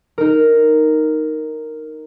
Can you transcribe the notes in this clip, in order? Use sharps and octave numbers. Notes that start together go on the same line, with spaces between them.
D#4 A#4